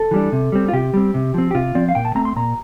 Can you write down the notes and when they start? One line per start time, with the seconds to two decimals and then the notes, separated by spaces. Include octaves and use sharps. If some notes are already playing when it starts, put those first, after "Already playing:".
Already playing: A4
0.11 E3 G3 D4
0.32 C3
0.52 G3 C4
0.68 F4
0.73 C3 G4
0.94 G3 C4
1.14 C3
1.34 F3 C4
1.51 G4
1.55 C3 F4
1.75 F3 C4 D5
1.89 F5
1.95 A#2 G5
2.05 A5
2.15 A3 C4 A#5
2.25 C6
2.36 A#2 A#5